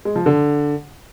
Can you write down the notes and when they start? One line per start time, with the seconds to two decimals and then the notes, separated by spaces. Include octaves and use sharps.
0.05 G#3
0.16 F3
0.26 D3